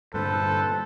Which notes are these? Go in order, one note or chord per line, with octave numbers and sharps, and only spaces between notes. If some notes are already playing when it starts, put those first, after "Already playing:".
G2 A#2 D3 A4 B4 C5